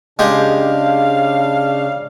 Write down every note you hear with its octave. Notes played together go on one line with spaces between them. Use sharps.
C#3 G#3 D4 G4 F5